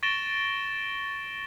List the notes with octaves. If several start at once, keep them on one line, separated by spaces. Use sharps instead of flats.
C#6 A6 A#6 D7 E7 G7